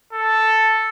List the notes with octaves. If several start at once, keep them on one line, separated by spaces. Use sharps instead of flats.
A4